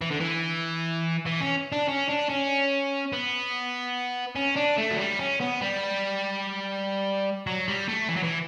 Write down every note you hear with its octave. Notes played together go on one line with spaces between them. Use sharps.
E3
D3
E3
E3
C#4
D4
C#4
D4
C#4
B3
C#4
D4
A3
F#3
G3
C#4
B3
G3
F#3
G3
A3
E3
F#3
E3